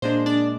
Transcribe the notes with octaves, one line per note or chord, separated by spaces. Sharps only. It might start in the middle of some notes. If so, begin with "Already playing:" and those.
A#2 G#3 D4 C5
D4 D5